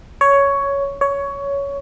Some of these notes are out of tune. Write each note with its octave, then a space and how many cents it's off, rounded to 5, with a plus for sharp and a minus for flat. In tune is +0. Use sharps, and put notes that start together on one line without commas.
C#5 +10
C#5 +15